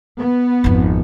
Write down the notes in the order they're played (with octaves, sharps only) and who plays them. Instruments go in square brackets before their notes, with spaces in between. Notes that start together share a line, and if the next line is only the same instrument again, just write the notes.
[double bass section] B3
[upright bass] G#1 F2